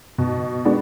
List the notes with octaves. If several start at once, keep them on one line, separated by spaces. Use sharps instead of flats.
B2
G#3 B3 D4